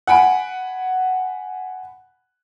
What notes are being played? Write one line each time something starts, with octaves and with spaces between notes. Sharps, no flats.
F#5 G#5 B5 D7